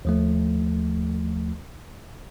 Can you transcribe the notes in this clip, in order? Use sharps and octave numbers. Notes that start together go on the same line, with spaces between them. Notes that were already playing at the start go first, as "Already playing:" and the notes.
D#2 F3 A3